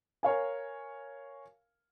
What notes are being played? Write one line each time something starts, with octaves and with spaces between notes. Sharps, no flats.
A#4 C#5 F5 G#5